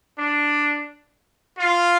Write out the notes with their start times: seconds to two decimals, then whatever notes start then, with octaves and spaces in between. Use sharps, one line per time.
0.18 D4
1.58 F4